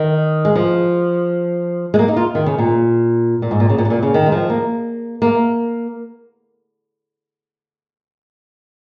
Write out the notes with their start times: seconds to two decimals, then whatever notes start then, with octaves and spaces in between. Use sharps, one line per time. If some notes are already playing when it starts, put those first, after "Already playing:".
Already playing: D#3
0.45 G#3
0.56 F3
1.94 G#3
1.99 A#3
2.08 D#4
2.16 F4
2.35 D#3
2.46 C#3
2.58 A#2
3.42 A#2
3.51 G#2
3.60 A#2
3.70 C#3
3.78 A#2
3.85 C#3
3.90 A#2
4.03 C#3
4.14 D#3
4.26 G#3
4.32 F3
4.50 A#3
5.22 A#3